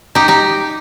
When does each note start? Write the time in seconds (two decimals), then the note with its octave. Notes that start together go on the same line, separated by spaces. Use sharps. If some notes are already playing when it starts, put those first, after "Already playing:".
0.15 D#4 G4
0.28 D#4 G4